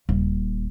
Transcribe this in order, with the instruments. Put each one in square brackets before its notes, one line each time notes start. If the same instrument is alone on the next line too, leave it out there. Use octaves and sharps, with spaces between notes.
[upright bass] D#1